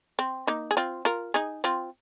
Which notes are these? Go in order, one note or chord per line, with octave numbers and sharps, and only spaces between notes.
C4
A#3 D#4
G#4
C4 F4
F4 A#4
D#4 G#4
C4 F4